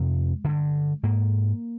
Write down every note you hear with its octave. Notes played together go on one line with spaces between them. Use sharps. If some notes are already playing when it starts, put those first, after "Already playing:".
Already playing: F2 C3 G#3
G2 D3
G#2 A#3